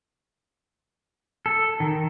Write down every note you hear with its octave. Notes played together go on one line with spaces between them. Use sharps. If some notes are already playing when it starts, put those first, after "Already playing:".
A4
D#3